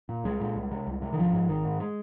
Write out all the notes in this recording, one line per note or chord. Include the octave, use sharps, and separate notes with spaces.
A#2
C2 G#3
A#2
C2
C3
C2
C3
D#3
G#1 F3
G#2
G#1 D#3
G#2
G#3